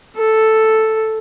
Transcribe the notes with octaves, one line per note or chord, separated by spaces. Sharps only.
A4